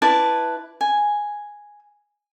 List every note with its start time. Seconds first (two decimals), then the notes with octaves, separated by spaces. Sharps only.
0.02 E4 B4 D5 A5
0.81 G#5